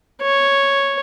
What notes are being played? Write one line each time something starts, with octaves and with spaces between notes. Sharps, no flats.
C#5